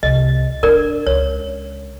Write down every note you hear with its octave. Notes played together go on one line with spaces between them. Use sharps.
C2 D#5
D4 A#4 D5
C#2 C#5